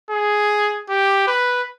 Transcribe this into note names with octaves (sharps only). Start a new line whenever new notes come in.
G#4
G4
B4